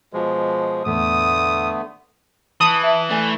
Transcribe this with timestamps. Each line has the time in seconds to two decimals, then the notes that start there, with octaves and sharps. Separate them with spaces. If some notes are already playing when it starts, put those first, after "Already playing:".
0.13 B2 F3 G#3
0.86 E2 A2 D3 A3 B3 D#6
2.61 E3 A5 D#6
2.83 E4 E5 A5
3.10 A3 D5 G#5